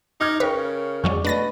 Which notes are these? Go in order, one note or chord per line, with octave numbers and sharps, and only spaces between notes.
D#4 D6 F6 G#6
C#3 A#4 B4 C#5 G5 C#6
F2 F#3 G#3 D5 C#6
B2 A3 D4 B4 A6 A#6